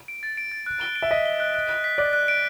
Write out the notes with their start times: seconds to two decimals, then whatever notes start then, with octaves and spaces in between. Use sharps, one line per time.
0.08 D7
0.23 A6
0.37 D7
0.52 A6
0.66 F#6
0.81 G7
0.96 D7
1.02 E5
1.11 D#5 B6
1.25 G7
1.40 F#6
1.54 F#6
1.69 F#6
1.84 B6
1.98 D5 F#6
2.13 F#6
2.28 D7